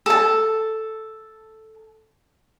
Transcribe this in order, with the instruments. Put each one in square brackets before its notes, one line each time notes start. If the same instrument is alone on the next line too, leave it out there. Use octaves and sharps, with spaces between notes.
[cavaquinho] A4 A5